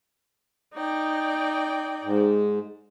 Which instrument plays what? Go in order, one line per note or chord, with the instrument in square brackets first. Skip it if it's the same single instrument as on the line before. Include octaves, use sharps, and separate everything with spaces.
[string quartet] D#4 D5 G5
[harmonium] G#2